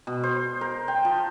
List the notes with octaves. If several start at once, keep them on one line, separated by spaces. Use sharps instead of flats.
B2
C5
A#4
G5
F3